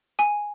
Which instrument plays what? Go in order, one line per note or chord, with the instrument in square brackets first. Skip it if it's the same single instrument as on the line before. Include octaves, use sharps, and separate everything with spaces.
[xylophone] G#5